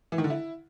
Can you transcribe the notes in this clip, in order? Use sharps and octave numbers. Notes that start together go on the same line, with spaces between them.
E3
D#3
D3
E4